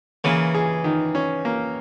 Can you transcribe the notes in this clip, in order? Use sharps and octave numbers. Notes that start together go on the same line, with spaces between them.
C#3 E3 A#3
G#4
D#3
C#4
A#3